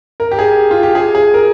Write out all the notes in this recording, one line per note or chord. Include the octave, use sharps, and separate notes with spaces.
A#4
G4
G#4
F4
G4
G#4
G#4
A#4